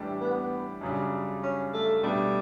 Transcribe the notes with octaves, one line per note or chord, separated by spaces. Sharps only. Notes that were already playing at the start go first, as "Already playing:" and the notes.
Already playing: A2 E3 G3 D4 G4
B3
F#2 C#3 G3 C#4 D4
C#4
A3
B2 G3 A3 D4